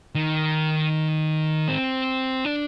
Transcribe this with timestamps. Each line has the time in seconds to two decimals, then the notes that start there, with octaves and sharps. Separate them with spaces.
0.15 D#3
1.68 C4
2.45 D4